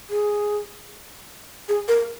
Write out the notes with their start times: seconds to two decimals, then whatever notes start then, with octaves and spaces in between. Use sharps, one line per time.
0.10 G#4
1.69 G#4
1.88 A#4